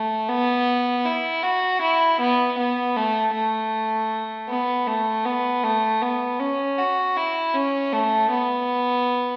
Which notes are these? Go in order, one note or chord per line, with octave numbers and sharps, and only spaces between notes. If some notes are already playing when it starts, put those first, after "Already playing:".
Already playing: A3
B3
E4
F#4
E4
B3
B3
A3
A3
B3
A3
B3
A3
B3
C#4
F#4
E4
C#4
A3
B3